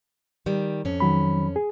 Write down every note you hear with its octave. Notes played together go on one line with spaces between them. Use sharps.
D#3 G3
F2 C#4
D#3 F#3 B5
G#4